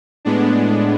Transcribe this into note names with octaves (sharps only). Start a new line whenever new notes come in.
A2 G#3 B3 D4